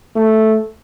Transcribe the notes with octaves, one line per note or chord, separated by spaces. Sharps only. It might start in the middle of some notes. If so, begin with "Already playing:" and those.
A3